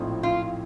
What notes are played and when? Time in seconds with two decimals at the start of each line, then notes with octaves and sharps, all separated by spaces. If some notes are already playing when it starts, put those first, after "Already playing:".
Already playing: A#1 A2 F3 C4 D#4
0.23 F4